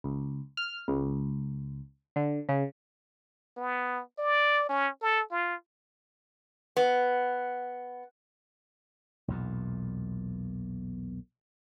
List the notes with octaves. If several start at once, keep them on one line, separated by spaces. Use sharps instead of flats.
C#2
F6
C#2
D3
C#3
B3
D5
C#4
A4
F4
B3
B1 E2 A#2